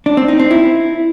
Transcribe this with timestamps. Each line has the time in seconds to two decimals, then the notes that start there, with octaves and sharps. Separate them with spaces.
0.06 D4
0.17 C4
0.28 D#4
0.40 C4
0.51 E4